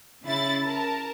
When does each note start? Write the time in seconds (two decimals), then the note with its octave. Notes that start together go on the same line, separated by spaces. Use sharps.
0.23 C#3 E4 A6
0.63 A#4 A5